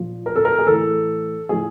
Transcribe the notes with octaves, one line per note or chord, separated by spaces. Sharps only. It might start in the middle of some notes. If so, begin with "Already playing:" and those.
Already playing: A#2 F3
A#4
A4
A#4
G#4
A2 E3 A4
A2 F3 G#4